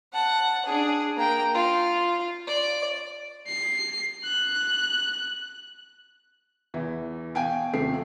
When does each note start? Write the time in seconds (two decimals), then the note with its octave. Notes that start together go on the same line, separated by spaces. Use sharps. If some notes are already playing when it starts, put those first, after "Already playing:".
0.13 F#5 A5
0.66 D4 G#4
1.16 A#3 G5
1.55 F4
2.47 D5
3.47 C7
4.25 F#6
6.74 E2 E3
7.35 B2 F5 G5 G#5 D7
7.73 D#1 C3 A3 C7